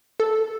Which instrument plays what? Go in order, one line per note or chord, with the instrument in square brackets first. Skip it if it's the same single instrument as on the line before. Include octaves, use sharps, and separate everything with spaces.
[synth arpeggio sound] A4